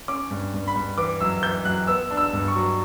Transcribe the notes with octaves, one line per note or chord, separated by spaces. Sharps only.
C#4 D6
G2
G2
B5
G2
E3 D6
F#2 E6
E3 G6
F#2 F#6
B3 E6
D4
E6
G2
C#6
F#3